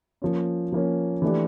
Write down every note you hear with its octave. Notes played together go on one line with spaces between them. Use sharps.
F3 A#3 C#4
F3 A#3 C#4
E3 A3 D4 G4